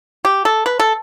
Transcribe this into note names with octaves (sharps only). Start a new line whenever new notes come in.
G4
A4
B4
A4